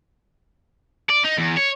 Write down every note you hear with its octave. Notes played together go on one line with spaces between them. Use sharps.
D5
D#4
E2
C#5